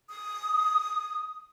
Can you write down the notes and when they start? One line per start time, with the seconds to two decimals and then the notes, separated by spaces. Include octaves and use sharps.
0.08 D#6